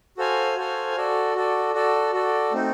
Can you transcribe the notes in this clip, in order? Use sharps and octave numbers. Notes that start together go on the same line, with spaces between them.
F#4 A4 C5 F5 G#5
F#4 A4 C5 F5 G#5
F#4 A4 D5
F#4 A4 D5
F#4 A4 D5
F#4 A4 D5
A3 C4 D#4